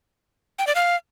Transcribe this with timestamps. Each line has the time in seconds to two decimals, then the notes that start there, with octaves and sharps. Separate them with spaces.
0.59 G5
0.67 D5
0.75 F5